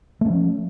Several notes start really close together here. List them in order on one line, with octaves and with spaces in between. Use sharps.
A3 C#4 F3